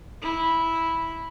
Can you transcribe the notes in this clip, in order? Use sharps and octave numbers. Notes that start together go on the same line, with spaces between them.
E4